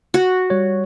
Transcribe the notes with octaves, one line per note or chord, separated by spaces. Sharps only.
F#4
G3 C#5